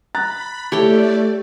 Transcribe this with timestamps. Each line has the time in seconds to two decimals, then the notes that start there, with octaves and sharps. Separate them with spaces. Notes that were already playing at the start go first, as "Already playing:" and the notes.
0.15 A#5 B5 F#6 A6
0.72 A3 E4 G4 A4 C#5 D5 G5